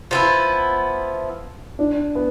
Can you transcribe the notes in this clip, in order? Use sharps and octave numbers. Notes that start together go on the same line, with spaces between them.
F3 B3 E4
D4
B3